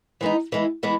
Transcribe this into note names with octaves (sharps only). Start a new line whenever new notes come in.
E3 G#3 B3 D#4
E3 G#3 B3 E4
E3 G#3 B3 E4